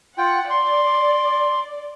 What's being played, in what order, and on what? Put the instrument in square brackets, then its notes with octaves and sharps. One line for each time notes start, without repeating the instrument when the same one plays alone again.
[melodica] F4 G5 [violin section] F#5
[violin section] D5 [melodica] C6